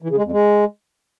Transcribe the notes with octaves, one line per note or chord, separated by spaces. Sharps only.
E3
C#3
G#3
F2
G#3